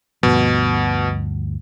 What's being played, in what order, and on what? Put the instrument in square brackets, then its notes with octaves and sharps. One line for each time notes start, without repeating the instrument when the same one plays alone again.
[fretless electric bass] D2 G2 F3 [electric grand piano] B2